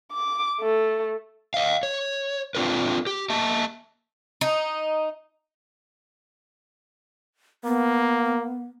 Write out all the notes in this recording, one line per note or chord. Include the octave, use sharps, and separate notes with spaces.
D6
A3
D#5 F5
C#5
C4 D4 F4 A4 B4
G4
A#3 D#5 E5 A5
D#4
A#3 B3